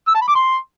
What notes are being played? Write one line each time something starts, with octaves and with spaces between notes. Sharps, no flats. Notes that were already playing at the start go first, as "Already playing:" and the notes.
E6
A5
B5
D6
C6